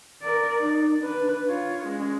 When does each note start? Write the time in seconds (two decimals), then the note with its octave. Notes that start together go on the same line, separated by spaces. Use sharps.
0.23 A#4 D5
0.63 D#4
0.99 D4 B4
1.48 F4 C#5
1.86 G#3 C#4